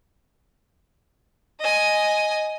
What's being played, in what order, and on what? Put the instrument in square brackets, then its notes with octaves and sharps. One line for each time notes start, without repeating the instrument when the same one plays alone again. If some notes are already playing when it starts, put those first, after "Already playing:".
[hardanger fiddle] D#5 G#5